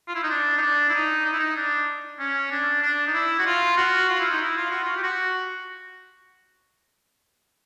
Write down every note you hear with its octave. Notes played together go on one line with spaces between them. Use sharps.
F4
E4
D#4
D4
D#4
D4
E4
D#4
D#4
E4
D#4
D4
C#4
D4
D4
D#4
E4
F#4
F4
F#4
F4
E4
D#4
E4
F4
F#4
F4
G4
F#4